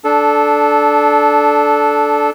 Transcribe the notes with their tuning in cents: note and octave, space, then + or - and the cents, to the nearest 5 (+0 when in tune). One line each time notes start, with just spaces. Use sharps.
D4 +0 A4 -15